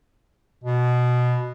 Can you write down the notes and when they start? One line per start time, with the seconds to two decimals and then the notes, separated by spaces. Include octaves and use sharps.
0.64 B2